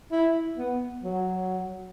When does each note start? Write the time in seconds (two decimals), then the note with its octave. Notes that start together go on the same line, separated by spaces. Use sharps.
0.12 E4
0.58 B3
1.04 F#3